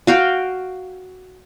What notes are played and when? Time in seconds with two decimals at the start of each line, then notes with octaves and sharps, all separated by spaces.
0.07 F#4 F5 G5